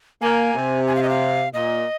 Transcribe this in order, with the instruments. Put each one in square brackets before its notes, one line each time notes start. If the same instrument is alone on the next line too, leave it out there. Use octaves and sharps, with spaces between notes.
[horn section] A#3 [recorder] G#5
[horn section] C3
[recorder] G#5
F5
D#5
F5
[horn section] A#2 [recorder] D#5